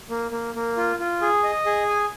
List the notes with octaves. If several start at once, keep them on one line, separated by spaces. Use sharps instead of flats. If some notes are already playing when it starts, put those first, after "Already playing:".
A#3
A#3
A#3
F4
F4
G#4
D#5
G#4
G#5